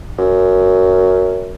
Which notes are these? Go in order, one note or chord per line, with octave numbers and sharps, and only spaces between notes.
F#2